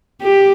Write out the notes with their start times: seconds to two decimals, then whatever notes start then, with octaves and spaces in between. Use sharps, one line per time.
0.23 G4